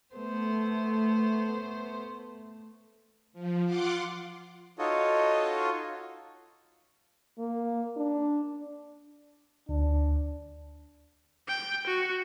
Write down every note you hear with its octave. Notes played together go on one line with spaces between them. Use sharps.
A3 B3 C5
F3
F4 F#5 C6 D6
D#4 F4 F#4 A4 C#5 D#5
A#3
D4
D2 D4
G5
F#4